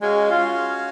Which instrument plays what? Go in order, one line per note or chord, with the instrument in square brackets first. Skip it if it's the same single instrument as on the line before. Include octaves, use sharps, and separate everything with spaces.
[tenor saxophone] G#3 [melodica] C#4 F#4 C#5 F5
[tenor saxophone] F4